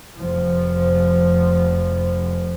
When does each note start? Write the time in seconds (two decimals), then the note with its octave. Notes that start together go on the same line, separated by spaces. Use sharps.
0.18 F1 F3